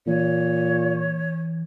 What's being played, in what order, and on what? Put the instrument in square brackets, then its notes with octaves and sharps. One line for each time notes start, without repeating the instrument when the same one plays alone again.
[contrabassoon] A#2 [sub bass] E3 [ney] C#5